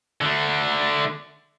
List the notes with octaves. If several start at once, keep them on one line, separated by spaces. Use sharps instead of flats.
D3 A3